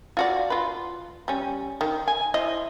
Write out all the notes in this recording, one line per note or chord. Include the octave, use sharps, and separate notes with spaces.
F4 F#4 D5
F4 B4
G3 C#4
D#3
G#5
E4 C5 D#5